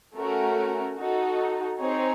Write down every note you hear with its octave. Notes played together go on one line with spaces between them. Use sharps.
A3 C#4 F#4 A#4
D#4 F#4 A4
C4 D#4 G#4 C#5